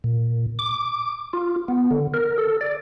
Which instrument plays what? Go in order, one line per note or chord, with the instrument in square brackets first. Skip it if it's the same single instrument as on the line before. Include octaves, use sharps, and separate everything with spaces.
[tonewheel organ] A#2
D6
F4
B3
D3
A#4
A4
D5